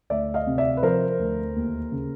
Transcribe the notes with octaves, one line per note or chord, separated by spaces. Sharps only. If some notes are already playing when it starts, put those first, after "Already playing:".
D2 D5 E5
D#5 F5
C3
D5 E5
B4
F3 A#4 C5
D2
D#2
C#3